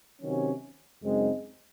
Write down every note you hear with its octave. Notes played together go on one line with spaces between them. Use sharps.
C3 D#3 F#3 C#4
F#2 C#3 G#3 C4 D#4